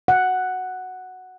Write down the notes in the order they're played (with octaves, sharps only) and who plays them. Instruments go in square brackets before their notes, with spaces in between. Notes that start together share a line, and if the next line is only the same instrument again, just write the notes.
[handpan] F#5